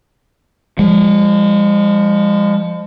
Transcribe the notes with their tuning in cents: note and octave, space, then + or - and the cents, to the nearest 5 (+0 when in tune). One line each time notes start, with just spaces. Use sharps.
F3 +0 G#3 -35